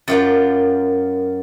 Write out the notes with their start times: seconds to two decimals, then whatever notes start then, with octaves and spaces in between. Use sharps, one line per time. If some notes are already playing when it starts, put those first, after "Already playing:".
0.08 F#2 F4 G4 A#4 F#5 A6